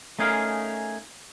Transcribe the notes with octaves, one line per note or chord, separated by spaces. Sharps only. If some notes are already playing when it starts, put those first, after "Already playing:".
A3 C#4 D#4 G#4 A#4 F5